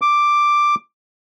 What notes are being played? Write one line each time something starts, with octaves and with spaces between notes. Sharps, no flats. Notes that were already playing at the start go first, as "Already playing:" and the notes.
D6